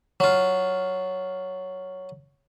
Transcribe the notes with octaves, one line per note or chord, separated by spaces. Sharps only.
F#3 F4